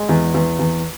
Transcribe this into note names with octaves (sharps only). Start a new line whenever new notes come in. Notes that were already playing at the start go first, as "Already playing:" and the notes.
Already playing: G#3
E2
E2
E2